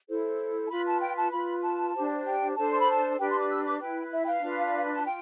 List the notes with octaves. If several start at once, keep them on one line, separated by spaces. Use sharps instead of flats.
E4 A4 C5
A5
F4 B4 B5
A5
G5
A5
F4 B4 B5
A5
D4 G4 C5
G5
D4 A4 C5 A5
C6
B5
A5
D4 G4 B4 G5
C6
D6
E6
D6
E4 B4 G5
E5
G5
F5
D4 F4 B4
A5
F4 G5